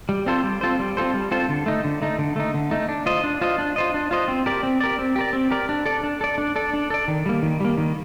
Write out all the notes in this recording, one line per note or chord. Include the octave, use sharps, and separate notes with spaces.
G3
C4 F4 A4 C5
G3
C4 F4 A4 C5
G3
C4 F4 A4 C5
G3
C4 F4 A4 C5
D3
A3 D#4
D3
A3 D#4
D3
A3 D#4
D3
A3 D#4
D4
F4 C5 D#5
D4
F4 C5 D#5
D4
F4 C5 D#5
D4
F4 C5 D#5
C4
G4 A#4 D5
C4
G4 A#4 D5
C4
G4 A#4 D5
C4
G4 A#4 D5
D4
A4 D5
D4
A4 D5
D4
A4 D5
D4
A4 D5
D#3
G3 A#3
D#3
G3 A#3
D#3